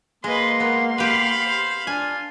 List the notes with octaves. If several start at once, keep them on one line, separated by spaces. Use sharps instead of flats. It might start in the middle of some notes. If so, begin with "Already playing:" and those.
G#3 A#3 B4 D#5 C6
B3 A#4
G4 B4 F5 B5
C5
D4 F4 G#5